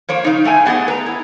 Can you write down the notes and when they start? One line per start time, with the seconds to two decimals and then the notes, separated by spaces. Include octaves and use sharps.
0.09 F3 A#3 C5 C#5
0.24 C#3 D#4
0.44 A2 A3 G5 G#5
0.65 F#3 B3 G#4 D#5 F#5
0.88 B4 A#5
1.06 E4